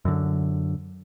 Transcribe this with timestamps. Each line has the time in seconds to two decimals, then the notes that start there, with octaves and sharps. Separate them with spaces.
0.05 F#2 D3